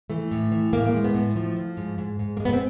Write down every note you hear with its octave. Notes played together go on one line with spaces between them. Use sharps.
E3 A3
A2
E3
A2 A#3
A#3
G#3
B3
A2
F3
F3
G#2
G#2
G#2
A#3
G#3
B3
C4